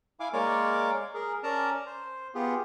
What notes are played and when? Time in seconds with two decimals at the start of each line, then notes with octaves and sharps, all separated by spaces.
0.20 E4 F5 G#5 D6
0.33 G#3 A#3 A#4 C#5 D5 D6
1.14 G#4 A#4
1.43 C#4 A#4 D5 A5 A#5
1.86 C5
2.35 B3 F4 G4 G#4